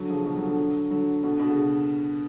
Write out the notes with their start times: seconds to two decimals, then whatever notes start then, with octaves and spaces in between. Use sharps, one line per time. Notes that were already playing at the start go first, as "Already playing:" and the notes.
Already playing: D3 F#3
0.09 C#3 F3
0.26 B2 D3
0.37 D3 F#3
0.47 D3 F#3
0.91 D3 F#3
1.23 B2 D3
1.39 B2 D3
1.50 C#3